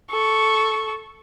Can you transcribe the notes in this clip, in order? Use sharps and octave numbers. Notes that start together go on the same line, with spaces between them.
A4 C#6